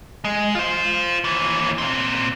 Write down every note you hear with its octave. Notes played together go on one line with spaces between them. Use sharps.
G#3
F4 C5
D#2 E3
A#2 C4